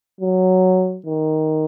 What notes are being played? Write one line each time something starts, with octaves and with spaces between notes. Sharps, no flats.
F#3
D#3